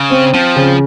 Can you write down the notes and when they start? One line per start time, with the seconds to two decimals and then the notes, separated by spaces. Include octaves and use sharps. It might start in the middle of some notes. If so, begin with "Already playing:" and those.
Already playing: C#3
0.10 C4
0.33 F3 C4
0.56 C#3